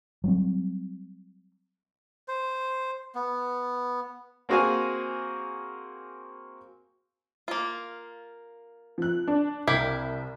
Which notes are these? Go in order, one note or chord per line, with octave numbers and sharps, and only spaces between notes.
F#3 G3 C4
C5
B3
A#3 C4 F#4 G#4 F5 G#5
A#3 F4
F3 F#6
D4
C2 E4 G4 F5